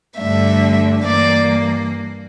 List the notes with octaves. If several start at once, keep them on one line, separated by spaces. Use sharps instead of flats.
G2 D3 A3 E5
G2 E3 A#3 D5